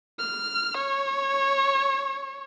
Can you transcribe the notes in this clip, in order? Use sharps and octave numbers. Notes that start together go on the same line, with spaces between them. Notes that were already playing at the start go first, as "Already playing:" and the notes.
F6
C#5